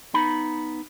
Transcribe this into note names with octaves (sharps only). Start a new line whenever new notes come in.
B3 D#4 B5